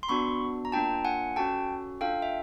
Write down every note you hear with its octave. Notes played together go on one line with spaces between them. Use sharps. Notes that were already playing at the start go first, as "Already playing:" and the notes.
C6
B3 D4 F#4 B5 C#6
A#5
A#3 D4 F4 G5 A5
F#5 G#5
C#4 F#4 A4 G5 A5
D4 F4 A4 F5 G5
E5